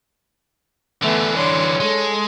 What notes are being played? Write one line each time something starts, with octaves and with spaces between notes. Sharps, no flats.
D3 E3 A3 B3
D4 C#5 C6
G#3 A4